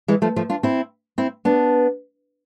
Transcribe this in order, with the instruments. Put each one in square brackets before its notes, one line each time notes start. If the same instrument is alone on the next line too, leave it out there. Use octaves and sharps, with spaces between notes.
[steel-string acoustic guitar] E3 G#3
F3 A3
F3 A3
D4 F4
C4 E4
C4 E4
B3 D4